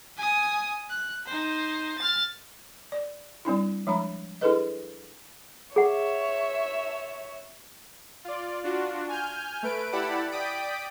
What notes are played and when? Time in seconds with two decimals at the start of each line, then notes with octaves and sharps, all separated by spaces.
0.17 G#5 D#6
0.89 F#6
1.26 D#4 C5
1.98 F6 A6
2.92 D5
3.45 G3 C4 D4 E4
3.87 F3 G#3 D4 A#5 B5
4.41 D4 E4 G#4 A4 B4 D#5
5.76 G#4 C#5 E5 F#5
8.25 F4 D5
8.64 D4 F4 F#4
9.09 G#5 F6 G6
9.63 A3 B4 D7
9.92 E4 G4 D5 F#5 A5 B5
10.31 D5 G5 D#6 B6 D7